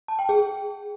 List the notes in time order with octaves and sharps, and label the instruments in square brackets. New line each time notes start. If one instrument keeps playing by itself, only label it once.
[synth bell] A5
G5
G#4